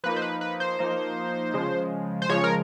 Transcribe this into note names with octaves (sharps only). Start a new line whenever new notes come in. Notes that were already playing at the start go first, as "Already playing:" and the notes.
F3 A#3 D#4 B4
C5
B4
B4
C5
F3 A#3 D#4
C#3 F3 G#3
C5
C#3 F3 G#3 C#5
A#4